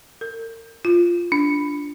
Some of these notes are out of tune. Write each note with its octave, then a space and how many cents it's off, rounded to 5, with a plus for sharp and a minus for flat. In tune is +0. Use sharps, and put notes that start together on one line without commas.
A#4 -35
F4 -5
D4 -10